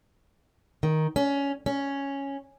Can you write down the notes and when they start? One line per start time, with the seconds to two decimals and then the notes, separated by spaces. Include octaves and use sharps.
0.83 D#3
1.16 C#4
1.66 C#4